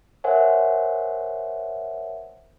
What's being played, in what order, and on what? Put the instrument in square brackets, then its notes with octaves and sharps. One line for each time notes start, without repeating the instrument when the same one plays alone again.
[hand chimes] A#4 C5 C#5 E5 F#5 G#5